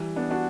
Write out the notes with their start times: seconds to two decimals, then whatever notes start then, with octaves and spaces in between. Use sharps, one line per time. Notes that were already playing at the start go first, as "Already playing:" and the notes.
Already playing: E3 G3
0.16 B3 D4
0.31 D4 F#4